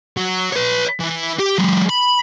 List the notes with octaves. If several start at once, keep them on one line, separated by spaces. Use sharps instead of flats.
F#3
B4 C#5
E3
G4
F#3 G#3
B5